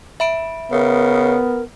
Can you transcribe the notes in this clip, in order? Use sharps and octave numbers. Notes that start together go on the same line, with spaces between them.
E5 B5 D7
C#3 B3 A#4